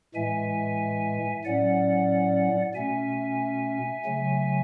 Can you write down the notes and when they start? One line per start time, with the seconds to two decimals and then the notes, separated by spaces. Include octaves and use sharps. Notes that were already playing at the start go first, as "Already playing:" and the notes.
0.15 A2 E3 G#3 E5 G#5
1.45 A2 F#3 C#4 D5 F#5
2.74 B2 A3 C#4 E5 G#5
4.04 C#3 F#3 A3